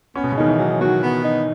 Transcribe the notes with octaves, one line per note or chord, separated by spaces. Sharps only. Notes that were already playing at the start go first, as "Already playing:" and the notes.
B3 C#4
B2
C#3
D#3 D#4
E3
F#3
D#3 F#4
B3
D#4